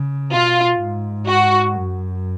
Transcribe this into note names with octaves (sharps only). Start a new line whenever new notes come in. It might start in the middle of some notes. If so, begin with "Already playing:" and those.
Already playing: C#3
B2 F4
G#2
F#4
F#2